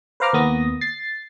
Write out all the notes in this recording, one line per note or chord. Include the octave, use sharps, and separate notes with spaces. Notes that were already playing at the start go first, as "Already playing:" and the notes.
B4 C5 F5 A#5 D6 F6
D#2 A#3 B3 D#6 A#6
A6 C7